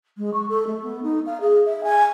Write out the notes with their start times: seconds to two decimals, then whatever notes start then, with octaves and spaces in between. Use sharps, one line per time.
0.17 G#3
0.33 C#6
0.49 A4
0.66 A3
0.82 B3
1.03 D#4
1.26 F5
1.40 G#4
1.65 E5
1.83 G#5